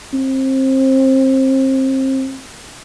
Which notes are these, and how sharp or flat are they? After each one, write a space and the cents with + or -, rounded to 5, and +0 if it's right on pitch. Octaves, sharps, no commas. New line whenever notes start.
C4 +25